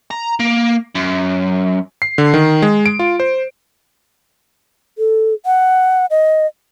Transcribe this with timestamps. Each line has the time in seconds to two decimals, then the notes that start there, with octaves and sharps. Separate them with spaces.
0.11 A#5
0.40 A#3
0.95 F#2
2.02 C7
2.18 D3
2.34 D#3
2.62 G#3
2.86 D7
2.99 F4
3.20 C5
4.98 A4
5.46 F#5
6.11 D#5